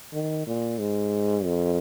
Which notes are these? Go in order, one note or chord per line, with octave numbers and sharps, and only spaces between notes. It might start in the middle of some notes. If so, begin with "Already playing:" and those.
D#3
A#2
G#2
F2